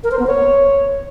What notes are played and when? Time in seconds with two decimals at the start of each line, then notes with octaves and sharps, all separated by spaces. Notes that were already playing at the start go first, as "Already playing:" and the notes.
0.04 A#4
0.11 C5
0.19 B3
0.27 C#5